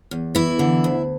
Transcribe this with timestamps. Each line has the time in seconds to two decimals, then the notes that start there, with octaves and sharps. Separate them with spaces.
0.11 E2
0.35 E3 E4
0.59 D3
0.84 D2